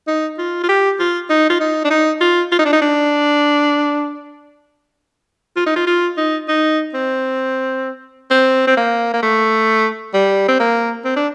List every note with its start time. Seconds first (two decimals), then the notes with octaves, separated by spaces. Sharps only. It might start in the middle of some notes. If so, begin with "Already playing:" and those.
0.07 D#4
0.38 F4
0.63 F4
0.69 G4
0.99 F4
1.30 D#4
1.50 F4
1.60 D#4
1.84 D4
1.90 D#4
2.21 F4
2.52 F4
2.59 D#4
2.65 D4
2.73 D#4
2.82 D4
5.56 F4
5.66 D#4
5.76 F4
5.87 F4
6.17 D#4
6.48 D#4
6.94 C4
8.31 C4
8.67 C4
8.77 A#3
9.14 A#3
9.22 A3
10.14 G3
10.48 C4
10.60 A#3
11.05 C4
11.16 D4